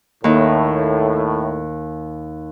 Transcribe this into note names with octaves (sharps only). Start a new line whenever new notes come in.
D#2 A2 D#4